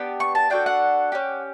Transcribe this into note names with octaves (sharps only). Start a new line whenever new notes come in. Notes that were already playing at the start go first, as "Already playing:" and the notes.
Already playing: B3 D4 G4
C#6
A5
D4 F#4 A4 G5
F#5
C#4 G4